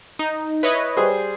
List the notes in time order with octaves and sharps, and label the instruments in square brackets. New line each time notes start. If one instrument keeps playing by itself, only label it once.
[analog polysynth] D#4
[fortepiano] E4 [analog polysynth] B4 C#5 D#5
[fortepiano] G3 G#4 C5